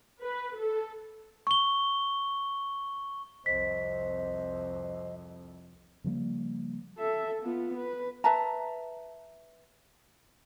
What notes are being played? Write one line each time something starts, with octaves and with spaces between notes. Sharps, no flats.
B4
A4
C#6 G7
C2 F2 C5 D#5 B6
C#3 F3 G3 A#3
A4 E5
B3 F4
B4
B4 E5 A5 A#5